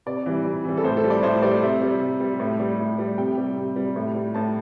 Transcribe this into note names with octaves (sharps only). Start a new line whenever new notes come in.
C3 D5
E3 G3
C3
E3 G3
A4
A2 C5
A4
G3
D5
A2 C5
G3 D5
C3 E5
G3
C3
G3
A2
G3
A2
G3
C3 G5
G3
C3
G3
A2
G3
A2 A5